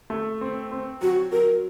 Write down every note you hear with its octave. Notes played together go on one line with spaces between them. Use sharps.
A3
C4
C4
F#3 F#4
F#3 A#4